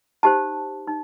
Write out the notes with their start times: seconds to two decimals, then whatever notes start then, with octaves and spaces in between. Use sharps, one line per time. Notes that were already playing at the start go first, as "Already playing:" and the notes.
0.23 D#4 G4 C5 A5
0.87 D#4